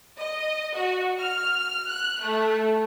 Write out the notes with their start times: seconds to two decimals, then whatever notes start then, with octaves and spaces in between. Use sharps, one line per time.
0.17 D#5
0.74 F#4
1.19 F6
1.89 F#6
2.23 A3